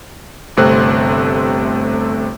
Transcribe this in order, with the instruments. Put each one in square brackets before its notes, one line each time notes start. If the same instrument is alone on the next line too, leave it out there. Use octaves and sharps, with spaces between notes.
[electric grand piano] G1 C3 A3 C4 F#6